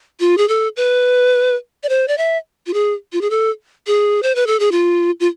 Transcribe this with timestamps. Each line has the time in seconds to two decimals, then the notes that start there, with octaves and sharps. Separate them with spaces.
0.20 F4
0.37 G#4
0.48 A4
0.76 B4
1.83 D5
1.89 C5
2.08 D5
2.18 E5
2.67 F4
2.74 G#4
3.13 F4
3.21 G#4
3.30 A4
3.87 G#4
4.23 C5
4.35 B4
4.47 A4
4.60 G#4
4.72 F4
5.20 F4